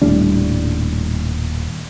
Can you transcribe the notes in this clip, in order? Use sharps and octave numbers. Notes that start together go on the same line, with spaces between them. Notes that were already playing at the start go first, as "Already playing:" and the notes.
D#1 A2 G3 D4